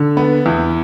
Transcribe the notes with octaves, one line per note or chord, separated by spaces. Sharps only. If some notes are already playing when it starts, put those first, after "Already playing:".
Already playing: D3
B3
E2